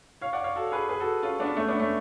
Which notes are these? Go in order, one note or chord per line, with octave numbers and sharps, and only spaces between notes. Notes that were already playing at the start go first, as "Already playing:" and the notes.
C#5 F5
D5 F#5
C#5 F5
F#4 A4
G#4 B4
G#4 B4
F#4 A4
C#4 F4
B3 D4
A3 C#4
B3 D4
A3 C#4